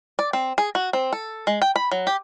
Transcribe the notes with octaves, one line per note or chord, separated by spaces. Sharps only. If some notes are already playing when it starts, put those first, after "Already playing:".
D5
C4
G#4
F#4
C4
A4
G#3
G5
B5
F#3
G4